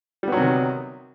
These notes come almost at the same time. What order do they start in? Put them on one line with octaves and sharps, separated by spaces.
G3 B3 F#3 C3 D#3